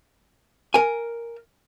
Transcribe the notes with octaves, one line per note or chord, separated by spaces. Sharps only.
A#4 G#5